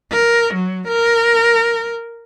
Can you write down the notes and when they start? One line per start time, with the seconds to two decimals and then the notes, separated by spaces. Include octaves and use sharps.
0.12 A#4
0.55 F#3
0.88 A#4